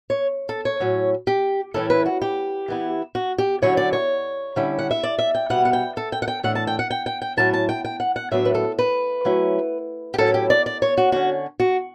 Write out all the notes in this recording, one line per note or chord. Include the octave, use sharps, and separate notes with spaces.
C#5
A4
C#5
A2 F#3 C#4
G4
A2 E3 G3 C#4 E4 A4
B4
F#4
G4
E3 B3 E4
F#4
G4
D3 F#3 C#4 E4 C#5
D5
C#5
D3 G3 C#4 E4
F#5
E5
D5
E5
G5
B2 G3 B3 F#5
F#5
G5
A4
G5
F#5
G5
A2 E3 A3 D4 F#5
A5
G5
F#5
G5
G5
G5
A2 F#3 C#4 E4 A5
A5
G5
G5
F#5
F#5
A2 F#3 B3 D4 E5
B4
A4
B4
F#3 A3 C#4 E4
G4
A2 F#3 C#4 E4 A4
G4
D5
D5
C#5
F#4
D3 G3 C#4 F#4
F#4